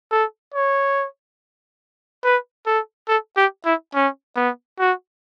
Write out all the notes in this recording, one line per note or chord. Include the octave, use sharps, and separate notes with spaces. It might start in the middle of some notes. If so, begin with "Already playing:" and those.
A4
C#5
B4
A4
A4
G4
E4
C#4
B3
F#4